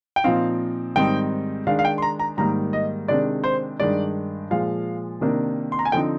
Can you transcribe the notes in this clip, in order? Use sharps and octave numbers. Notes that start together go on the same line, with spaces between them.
G5
A#2 F3 C4 D#4 F5
G#2 D#3 G3 C4 D#4 G5
D#3 G#3 D4 F5
F5
G5
C6
A#5
A#5
G#2 D#3 G3 A#3 A#5
D#5
C3 D#3 G#3 D4 D5
C5
G2 D#3 G#3 D4 D5
A#2 F3 G#3 F5
C3 D#3 A#3 D4
C6
A#5
G#5
D3 F3 C4 D#4 G5